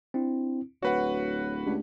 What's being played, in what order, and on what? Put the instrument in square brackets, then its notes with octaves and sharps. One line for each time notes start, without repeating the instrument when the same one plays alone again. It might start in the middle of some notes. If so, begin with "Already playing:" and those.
[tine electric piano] C4 D4 E4
[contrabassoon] D1 [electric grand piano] F#4 B4 F#5 [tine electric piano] C#5
[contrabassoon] C#2 [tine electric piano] A3 D4 G4